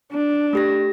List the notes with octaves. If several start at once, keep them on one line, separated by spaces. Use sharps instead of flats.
D4
A3 G4 A#6